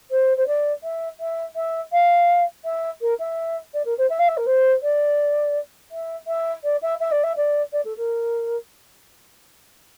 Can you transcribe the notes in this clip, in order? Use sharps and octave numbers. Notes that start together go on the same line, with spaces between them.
C5
C5
D5
E5
E5
E5
F5
E5
A#4
E5
D5
A#4
C5
E5
F5
E5
A#4
C5
D5
E5
E5
D5
E5
E5
D5
E5
D5
D5
A4
A#4